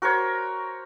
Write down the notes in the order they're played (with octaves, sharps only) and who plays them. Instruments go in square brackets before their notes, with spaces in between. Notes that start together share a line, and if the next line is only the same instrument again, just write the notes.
[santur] F#4 A#4 C5 C#5